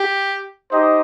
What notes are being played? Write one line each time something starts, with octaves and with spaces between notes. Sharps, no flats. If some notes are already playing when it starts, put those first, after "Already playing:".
Already playing: G4
D#4 G4 C5 D#5